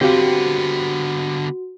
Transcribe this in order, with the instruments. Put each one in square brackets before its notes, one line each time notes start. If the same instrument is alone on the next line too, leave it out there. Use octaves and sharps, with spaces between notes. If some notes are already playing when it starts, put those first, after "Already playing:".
[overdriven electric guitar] D3 B3 [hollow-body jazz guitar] C4 G4 F5 [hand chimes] F#4